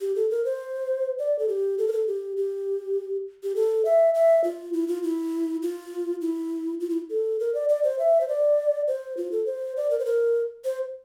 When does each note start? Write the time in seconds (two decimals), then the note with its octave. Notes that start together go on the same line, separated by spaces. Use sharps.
0.01 G4
0.16 A4
0.31 A#4
0.45 C5
1.19 D5
1.39 A4
1.48 G4
1.78 A4
1.88 A#4
1.93 A4
2.08 G4
2.37 G4
3.43 G4
3.56 A4
3.85 E5
4.14 E5
4.44 F4
4.73 E4
4.88 F4
5.03 E4
5.62 F4
6.21 E4
6.80 F4
6.90 E4
7.10 A4
7.40 A#4
7.55 D5
7.69 D5
7.84 C5
7.99 E5
8.21 C5
8.28 D5
8.88 C5
9.17 F4
9.32 A4
9.46 C5
9.77 D5
9.91 A#4
9.99 C5
10.06 A#4
10.65 C5